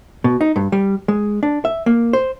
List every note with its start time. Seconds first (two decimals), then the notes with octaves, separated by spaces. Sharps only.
0.24 B2
0.41 D#4
0.56 G2
0.72 G3
1.08 G#3
1.43 D4
1.65 E5
1.86 A#3
2.13 C5